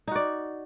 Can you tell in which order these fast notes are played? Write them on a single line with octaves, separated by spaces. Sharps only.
D#4 F#4 D5